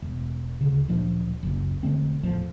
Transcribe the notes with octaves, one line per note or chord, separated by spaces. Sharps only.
E1
D2 C#3
D1 A#2 F3 D4
F#1 C#2
E1 D3 A3 C4
E2 A2 F3